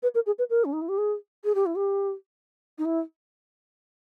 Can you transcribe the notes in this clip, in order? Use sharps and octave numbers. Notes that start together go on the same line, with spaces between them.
B4
A#4
G#4
B4
A#4
C#4
D#4
E4
G4
G#4
G#4
G4
E4
G4
D#4
E4